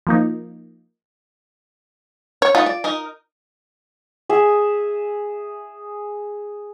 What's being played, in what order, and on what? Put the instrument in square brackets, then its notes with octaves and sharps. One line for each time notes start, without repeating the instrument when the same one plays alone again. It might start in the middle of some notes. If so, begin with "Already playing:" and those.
[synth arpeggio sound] F3 A#3 D#4
[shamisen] C#5
[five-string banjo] A3 B3 D#4 [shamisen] F4
[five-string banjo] D5
D#4 A#4 D#5
[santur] G#4 E5